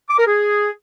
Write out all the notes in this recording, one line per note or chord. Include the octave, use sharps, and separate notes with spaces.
D6
A#4
G#4